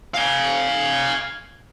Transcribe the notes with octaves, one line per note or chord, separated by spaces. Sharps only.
F5 G#5